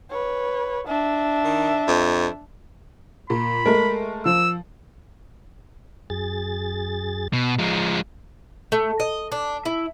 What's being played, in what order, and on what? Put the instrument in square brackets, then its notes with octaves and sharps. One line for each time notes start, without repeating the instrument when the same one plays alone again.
[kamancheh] B4 C#5
D4 E5
[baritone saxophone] D#3
F2
[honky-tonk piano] A#2 [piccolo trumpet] B5
[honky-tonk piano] G#3 A3 [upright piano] A#4
[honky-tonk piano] F3 [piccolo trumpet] E6
[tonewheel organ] F#2 G#4 A6
[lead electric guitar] B2
[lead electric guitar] F3 G#3 [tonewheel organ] A#5
[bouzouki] A3
D#5
D4
E4